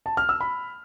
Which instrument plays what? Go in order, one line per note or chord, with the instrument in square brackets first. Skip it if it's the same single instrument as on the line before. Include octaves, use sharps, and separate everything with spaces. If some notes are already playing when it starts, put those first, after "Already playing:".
[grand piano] A5
F6
E6
B5